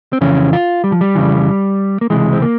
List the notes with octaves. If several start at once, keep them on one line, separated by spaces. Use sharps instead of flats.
C4
F2 C#3 E3 C#4
F4
G3
F3
G3
F2 C#3 E3
A#3
C#2 C3 E3 G#3
C4
A#3